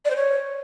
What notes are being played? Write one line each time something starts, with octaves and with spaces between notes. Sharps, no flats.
D5
C5
C#5